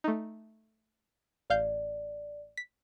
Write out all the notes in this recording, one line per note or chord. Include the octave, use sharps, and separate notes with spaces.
A3 D#4
A1 D5 F5 G6
B6